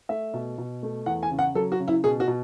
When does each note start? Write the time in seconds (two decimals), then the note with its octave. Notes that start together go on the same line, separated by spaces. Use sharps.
0.09 A3 E5
0.34 B2
0.58 B2
0.83 A3
1.06 E2 F#5
1.23 G#5
1.31 C#3
1.39 F#5
1.55 F#3 A4
1.72 F#4
1.80 C#3
1.88 E4
2.04 B2 G#4
2.20 F#4
2.28 B2